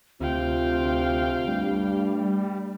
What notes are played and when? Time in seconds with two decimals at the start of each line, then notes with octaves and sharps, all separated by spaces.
0.21 D2 C3 F4 F5 G5
1.47 G2 G3 A3